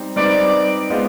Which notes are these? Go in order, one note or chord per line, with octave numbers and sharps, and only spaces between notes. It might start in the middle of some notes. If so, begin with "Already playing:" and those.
Already playing: G3 C4 D#4
G3 C4 D#4 B4 D5
G#3 B3 F4 C5 D#5